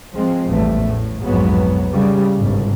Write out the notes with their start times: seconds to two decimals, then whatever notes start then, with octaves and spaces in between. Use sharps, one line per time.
0.14 F3 G#3 C4
0.47 A1 E2 G2 A3
0.86 A2
1.23 B1 F2 G#2 F#3 B3
1.92 C#3 G3
2.40 G1 C2 G#2